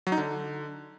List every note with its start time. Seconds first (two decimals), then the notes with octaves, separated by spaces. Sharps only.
0.07 F#3
0.12 D#4
0.18 D3